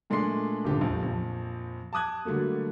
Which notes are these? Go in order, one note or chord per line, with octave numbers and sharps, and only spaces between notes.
A#2 G#3 A3 D4 C6 C7
D#1 G#1 D3 G4
A#1 F2
A#1 F2
A5 D6 D#6 F#6 G#6
D3 F#3 G3 A3 A#3